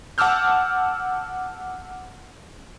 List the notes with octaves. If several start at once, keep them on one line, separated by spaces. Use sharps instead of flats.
F#5 A5 D6 E6 F6 G6